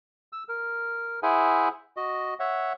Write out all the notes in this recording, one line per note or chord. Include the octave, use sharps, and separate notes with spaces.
E6
A#4
E4 G#4 C5 E5 F#5 G#5
F#4 D#5
C#5 E5 F#5